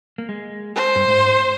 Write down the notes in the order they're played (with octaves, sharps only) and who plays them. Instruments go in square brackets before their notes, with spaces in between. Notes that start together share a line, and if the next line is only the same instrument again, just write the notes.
[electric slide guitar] A#3
G#3
[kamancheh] C5
[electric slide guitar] G2
G#2